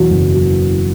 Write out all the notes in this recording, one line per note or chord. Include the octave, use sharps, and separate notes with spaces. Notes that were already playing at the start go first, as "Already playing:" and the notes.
Already playing: E2 B2 F#3
F#1
B2 F#3